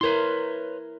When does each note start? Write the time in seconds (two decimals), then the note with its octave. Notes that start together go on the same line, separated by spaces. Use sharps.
0.01 E4 A#4 B4 C#5 C6